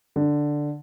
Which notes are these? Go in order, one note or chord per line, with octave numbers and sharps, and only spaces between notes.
D3